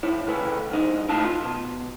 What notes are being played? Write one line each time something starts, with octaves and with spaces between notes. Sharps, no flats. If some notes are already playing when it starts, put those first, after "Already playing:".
G#2 E4 C#5
C#3 A4 B4
B1 G#2 D#4
A2 D#4 F4 A5
F4
B2